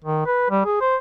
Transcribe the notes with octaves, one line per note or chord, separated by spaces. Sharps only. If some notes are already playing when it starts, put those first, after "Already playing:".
D#3
B4
G3
G#4
C5